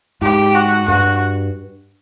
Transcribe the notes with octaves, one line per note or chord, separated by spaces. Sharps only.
G#2 G4
F#4
G2 F#4